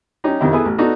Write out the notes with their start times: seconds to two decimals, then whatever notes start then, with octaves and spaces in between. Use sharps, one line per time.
0.24 G3 C#4 D#4 G4
0.40 F2 C3 D#3 E4 G4
0.53 B3 E4 G#4 A4 B4
0.65 A1
0.78 B3 D4 D#4 F#4 A4